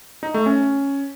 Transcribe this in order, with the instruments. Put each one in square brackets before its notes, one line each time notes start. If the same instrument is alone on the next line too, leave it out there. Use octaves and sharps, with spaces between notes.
[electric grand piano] D#4
A3
C#4